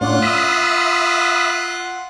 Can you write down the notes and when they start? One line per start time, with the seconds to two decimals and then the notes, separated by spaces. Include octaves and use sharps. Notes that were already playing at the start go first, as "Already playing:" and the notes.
0.01 A2 C#4 D4 F4 F#5
0.22 E5 B5 D#6